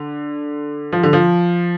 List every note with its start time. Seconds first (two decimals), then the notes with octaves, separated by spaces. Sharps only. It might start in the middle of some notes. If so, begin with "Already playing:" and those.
Already playing: D3
0.92 F3
1.03 D3
1.13 F3